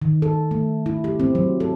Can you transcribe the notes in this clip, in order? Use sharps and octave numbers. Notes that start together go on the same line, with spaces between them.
D#3
A4
A3
E4
G4
C4
F#3
A4